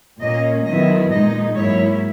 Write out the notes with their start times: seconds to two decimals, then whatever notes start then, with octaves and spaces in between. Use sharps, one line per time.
0.20 A#2 A#3 C#4 D#5
0.65 D#3 F#3 B3 E4 D#5
1.10 A#2 G#3 D#4 D#5
1.55 G#2 F#3 A#3 E4 C#5